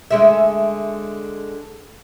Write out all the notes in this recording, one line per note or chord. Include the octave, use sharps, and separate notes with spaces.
D3 G#3 E5